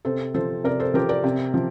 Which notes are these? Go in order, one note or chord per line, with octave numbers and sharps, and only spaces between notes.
C3 A4 C5
F3 A4 C5
C3 A#4 D5
A4 C5
F3 G4 A#4
A#4 D5
C3
F3